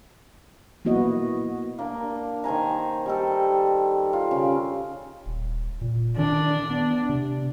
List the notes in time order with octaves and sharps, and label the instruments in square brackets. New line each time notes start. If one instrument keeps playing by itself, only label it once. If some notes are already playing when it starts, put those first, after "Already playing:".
[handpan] A#3 B3 E4 F#4 D#5
[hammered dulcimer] A#3 D4
D#3 C5 G#5 A#5
G3 D#4 A4
F4 G4
C#3
[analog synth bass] D#1
A#2
[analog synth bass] D#3 [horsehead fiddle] D4
[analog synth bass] B3
C3